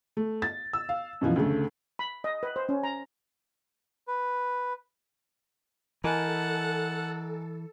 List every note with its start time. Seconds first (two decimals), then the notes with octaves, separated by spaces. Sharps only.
0.17 A3
0.42 A6
0.73 E6
0.89 F5
1.21 F#2 B2 E3 F3
1.36 D2 C#3 A3
1.99 B5
2.24 D#5
2.43 B4
2.56 C5
2.69 C#4
2.83 A#5
4.08 B4
6.04 E3 A4 A#4 D#5 F#5 G#5 A5